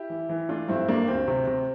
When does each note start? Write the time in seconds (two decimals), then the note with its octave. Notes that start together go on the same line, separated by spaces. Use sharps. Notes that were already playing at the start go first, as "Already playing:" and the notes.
Already playing: E4 G4
0.10 E3
0.29 E3
0.49 A3 D4 F4
0.68 G2 C4 E4
0.88 G2 A#3 D4
1.08 D2 C4
1.28 C3
1.47 C3